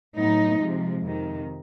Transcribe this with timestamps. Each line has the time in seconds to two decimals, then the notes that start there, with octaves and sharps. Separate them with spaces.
0.15 A2 F#3 B3 D#4
0.58 C3 F3 G#3
1.02 F2 C3 D#3